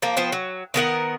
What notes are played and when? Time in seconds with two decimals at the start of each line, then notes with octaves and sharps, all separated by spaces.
0.02 F3 A#3
0.17 F3 B3 C5 G5
0.32 F#3
0.74 D#3 B3 A#4 F#5